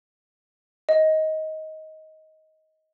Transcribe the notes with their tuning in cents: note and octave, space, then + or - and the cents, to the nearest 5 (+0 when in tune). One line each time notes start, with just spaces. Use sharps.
D#5 +15